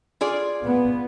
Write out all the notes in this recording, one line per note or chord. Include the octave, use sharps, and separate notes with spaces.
F4 G#4 D5
B3